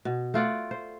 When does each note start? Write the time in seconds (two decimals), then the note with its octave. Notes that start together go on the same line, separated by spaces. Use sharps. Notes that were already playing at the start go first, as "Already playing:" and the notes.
0.05 B2
0.34 A3 F4 D5 F#5
0.71 C5